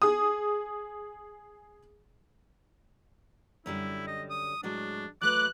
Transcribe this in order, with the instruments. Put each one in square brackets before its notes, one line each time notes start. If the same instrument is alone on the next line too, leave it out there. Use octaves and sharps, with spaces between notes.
[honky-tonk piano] G#4 D#6
[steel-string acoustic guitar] F#2 D3 G3 [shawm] E4
[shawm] D#5
D#6
[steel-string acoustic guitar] A2 F#3 G#3 [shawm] D4
[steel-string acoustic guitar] F#3 A3 B4 [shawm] D6 [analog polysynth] F#6